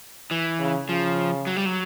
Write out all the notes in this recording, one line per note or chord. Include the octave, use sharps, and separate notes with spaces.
E3
C#3
C#3 F3
F#3
G3
F#3